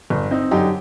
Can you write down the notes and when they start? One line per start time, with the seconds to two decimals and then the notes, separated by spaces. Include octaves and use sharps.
0.10 G1
0.31 C4 D#4
0.51 F#2 D3 D#4 G4